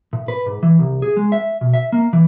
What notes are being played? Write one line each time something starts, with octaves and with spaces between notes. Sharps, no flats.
A2
B4
G#2
E3
C2
G#4
G#3
E5
B2
E5
A#3
E3